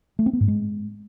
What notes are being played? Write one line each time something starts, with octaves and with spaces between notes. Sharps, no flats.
A3
C4
B3
G#2
G#3